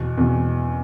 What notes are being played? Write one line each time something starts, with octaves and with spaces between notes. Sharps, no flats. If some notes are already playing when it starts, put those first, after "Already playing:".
Already playing: E2 B2
E2 B2